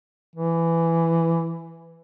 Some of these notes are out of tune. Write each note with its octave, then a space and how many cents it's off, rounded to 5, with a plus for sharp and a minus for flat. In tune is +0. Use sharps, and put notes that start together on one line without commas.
E3 +10